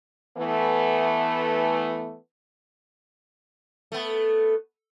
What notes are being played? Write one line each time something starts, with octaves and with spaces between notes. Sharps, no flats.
E3 A3 B3
A3 B3